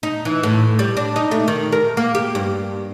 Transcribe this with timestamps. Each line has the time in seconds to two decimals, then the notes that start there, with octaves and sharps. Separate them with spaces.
0.03 D#4
0.25 E3
0.43 A2
0.79 G3
0.97 D4
1.16 D#4
1.31 A3
1.48 D#3
1.72 A#4
1.97 A#3
2.15 G4
2.35 G2